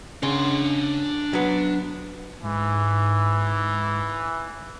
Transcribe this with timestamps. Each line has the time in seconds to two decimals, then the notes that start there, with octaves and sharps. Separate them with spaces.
0.23 C#3 D4 C6
1.33 F#3 B3
2.43 G#2 E3